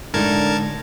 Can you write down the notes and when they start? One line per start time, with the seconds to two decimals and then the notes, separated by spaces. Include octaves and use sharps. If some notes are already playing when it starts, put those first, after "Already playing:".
0.14 A2 D3 G#3 D#4 A#4 A5 G#6